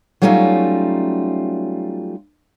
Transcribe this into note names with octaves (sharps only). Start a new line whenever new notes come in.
F#3 G3 A3 C#4 D#4 F4